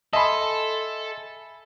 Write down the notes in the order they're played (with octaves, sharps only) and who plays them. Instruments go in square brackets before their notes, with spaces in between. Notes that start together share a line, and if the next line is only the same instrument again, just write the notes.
[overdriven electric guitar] A4 [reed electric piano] D#5 C6 [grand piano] E5 G#5 B5